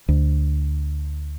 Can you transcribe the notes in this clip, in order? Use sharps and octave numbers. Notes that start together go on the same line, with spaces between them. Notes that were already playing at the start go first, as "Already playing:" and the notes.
D2